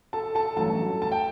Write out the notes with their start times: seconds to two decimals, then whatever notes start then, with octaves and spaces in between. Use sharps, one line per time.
0.13 A4 A5
0.35 A4 A5
0.56 A1 G2 F#3 A3 A4 A5
1.02 A5
1.12 G5